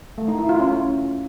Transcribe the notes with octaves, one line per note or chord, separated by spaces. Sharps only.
A3
D#4
E4
F4
C#4